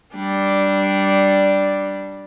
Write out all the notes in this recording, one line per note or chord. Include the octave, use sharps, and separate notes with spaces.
G3 D4